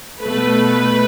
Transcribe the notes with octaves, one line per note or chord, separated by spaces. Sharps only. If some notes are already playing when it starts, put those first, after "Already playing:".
B2 A3 B4